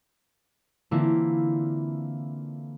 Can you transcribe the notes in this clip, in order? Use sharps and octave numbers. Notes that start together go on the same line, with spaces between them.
D3 E3 A#3 C4 E4 F4